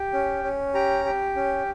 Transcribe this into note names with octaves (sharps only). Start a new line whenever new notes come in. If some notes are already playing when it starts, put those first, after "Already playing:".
Already playing: G4
C#4
C#4
G4 A#5
G4
C#4